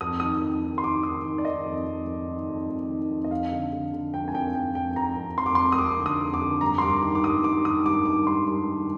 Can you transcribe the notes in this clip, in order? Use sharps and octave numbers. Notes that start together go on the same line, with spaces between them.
F2 D#6
D#3 D#6
F2
D#3
C6
D#3 D6
D#3 D#6
D#3
D5
D#3 D#5
F2
F2
F2
D#3
F2
F2
D#3
F2
D#5
F2 F5
D3
D3
D3
F2 G5
G#5
F2 G5
F2 G5
F2 G5
F2 A#5
F2
F2 C6
D6
F2 C6
D#6
F2 D6
D3
D#6
F2
D6
D3
G2 A#5
C6
G2 D6
D#3 D6
D6
G2 D#6
D#3 D6
D#3 D#6
G2 D6
D#3 D6
G2 C6
G2
D#3